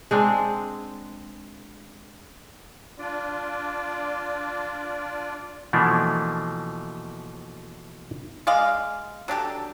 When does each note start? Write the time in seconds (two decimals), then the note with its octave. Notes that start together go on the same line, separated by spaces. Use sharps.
0.11 G#3 C4 D4
2.98 D4 F4 D5
5.73 B2 E3 F3 A3 A#3 D4
8.47 G#3 D5 D#5 F5
9.28 F#3 D4 G4 A4